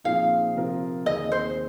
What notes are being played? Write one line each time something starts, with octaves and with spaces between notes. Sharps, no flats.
A#2 F3 C4 D#4 G#4 F5
C3 F3 C4 F4 A#4
D#2 D#3 C4 G#4 D#5
C5